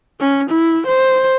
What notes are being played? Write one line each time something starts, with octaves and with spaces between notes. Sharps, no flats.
C#4
E4
C5